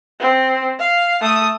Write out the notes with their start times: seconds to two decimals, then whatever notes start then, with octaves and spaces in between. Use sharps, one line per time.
0.20 C4
0.79 F5
1.21 A3 D#6